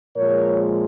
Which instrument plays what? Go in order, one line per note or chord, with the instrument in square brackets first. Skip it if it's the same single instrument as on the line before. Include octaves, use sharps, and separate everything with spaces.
[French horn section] A#2 F3 G#3 A#4 C#5